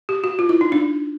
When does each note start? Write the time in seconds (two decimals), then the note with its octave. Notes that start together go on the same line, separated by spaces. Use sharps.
0.09 G4
0.24 F#4
0.39 F4
0.49 E4
0.61 D#4
0.72 D4